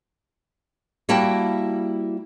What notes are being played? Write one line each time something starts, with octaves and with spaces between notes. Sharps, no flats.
G3 A#3 E4 F#4 G5 A5